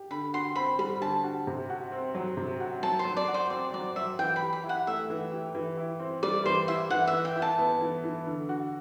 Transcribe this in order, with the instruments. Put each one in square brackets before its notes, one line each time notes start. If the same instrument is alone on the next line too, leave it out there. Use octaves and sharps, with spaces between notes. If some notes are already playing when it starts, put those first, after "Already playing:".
Already playing: [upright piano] G4
[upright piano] D3 [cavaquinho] B5
[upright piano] F#4 [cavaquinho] C6
[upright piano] C4 [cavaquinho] B5
[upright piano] G3 [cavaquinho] B5
[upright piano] D3 [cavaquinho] A5
[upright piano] F#4
C3
F#4
C4
F#3
C3
F#4
[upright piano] F#3 [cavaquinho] A5
[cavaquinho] C5
[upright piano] F#3
[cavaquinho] D5
[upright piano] F#4
[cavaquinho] C5
[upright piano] C4 [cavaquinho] D5
[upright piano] F#3 [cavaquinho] D5
[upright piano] F#3 [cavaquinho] E5
[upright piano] E3 [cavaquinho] G5
[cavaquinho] B5
[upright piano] G4
[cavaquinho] B5
[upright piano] E4
[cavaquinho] F#5
[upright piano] A3 [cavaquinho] E5
[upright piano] E3
G4
E3
E4
C4
[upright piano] G3 [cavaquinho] D5
[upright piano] E3 [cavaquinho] C5
[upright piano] E4 [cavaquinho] E5
[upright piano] E3 [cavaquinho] F#5
[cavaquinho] E5
[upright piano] E3
[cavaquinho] G5
[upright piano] E4
[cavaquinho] A5
[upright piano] B3
E3
E3
D3
F#4